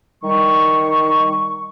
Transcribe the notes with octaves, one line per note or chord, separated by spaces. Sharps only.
D#3 G3 C#6